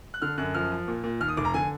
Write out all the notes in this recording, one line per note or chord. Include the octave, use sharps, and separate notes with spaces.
F#6
D3 F6
F#2 F#6
F3 F6
F3
A#2
A#2
D#2 F6
D#6
F1 D6
A#5
D3 G#5